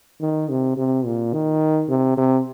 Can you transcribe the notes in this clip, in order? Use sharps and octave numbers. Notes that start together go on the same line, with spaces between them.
D#3
C3
C3
A#2
D#3
C3
C3